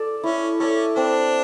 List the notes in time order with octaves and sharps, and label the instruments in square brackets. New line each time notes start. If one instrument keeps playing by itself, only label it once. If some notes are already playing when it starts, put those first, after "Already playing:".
Already playing: [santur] A4 D5
[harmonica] C#4 [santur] E4
[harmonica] C#4 [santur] A4 D5
[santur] C4 [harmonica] D4